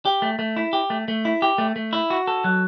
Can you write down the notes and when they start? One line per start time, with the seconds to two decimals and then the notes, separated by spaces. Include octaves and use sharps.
0.05 G4
0.22 A3
0.39 A3
0.56 E4
0.73 G4
0.90 A3
1.08 A3
1.25 E4
1.42 G4
1.58 A3
1.76 A3
1.93 E4
2.10 F#4
2.27 A4
2.44 F#3